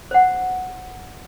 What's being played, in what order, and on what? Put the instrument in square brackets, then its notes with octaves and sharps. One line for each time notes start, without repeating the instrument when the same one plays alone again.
[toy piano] C5 F#5